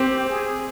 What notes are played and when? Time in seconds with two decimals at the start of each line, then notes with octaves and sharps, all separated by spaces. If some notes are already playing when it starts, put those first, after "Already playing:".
Already playing: C4 G4
0.29 G#4